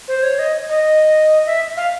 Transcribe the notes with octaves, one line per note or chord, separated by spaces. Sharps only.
C5
C#5
D#5
D#5
E5
F5